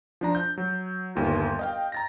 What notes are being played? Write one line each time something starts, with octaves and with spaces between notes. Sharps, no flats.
F3 D4 A#5
G6
F#3
G1 D#2 F4
D#5 F5 G5
A#5 A6 A#6